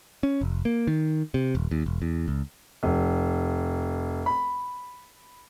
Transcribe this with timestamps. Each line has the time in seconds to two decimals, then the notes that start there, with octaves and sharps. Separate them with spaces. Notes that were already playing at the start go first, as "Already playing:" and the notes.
0.23 C#4
0.41 F1
0.65 A#3
0.87 D#3
1.34 C3
1.55 D#1
1.71 D#2
1.86 E1
2.02 E2
2.28 C#2
2.83 F1
4.26 B5